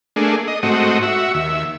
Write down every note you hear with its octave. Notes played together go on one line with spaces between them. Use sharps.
A3 A#3 D4 G#4
D#5
G#2 A3 C4 F#4 D#5
F#4 E5
D#2 E5